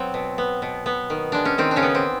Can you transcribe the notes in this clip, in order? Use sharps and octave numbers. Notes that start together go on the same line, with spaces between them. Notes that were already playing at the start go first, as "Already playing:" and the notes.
Already playing: F#3 B3 C4
B2
B3
B2
B3
D#3
G#3 D4
C#4
D#3 C4
D4
C#3 C#4
B3
C4